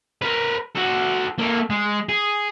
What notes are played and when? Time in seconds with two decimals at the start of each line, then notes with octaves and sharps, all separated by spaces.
0.22 A#4 B4
0.75 F#4 A4
1.38 A#3 A4
1.70 G#3
2.09 G#4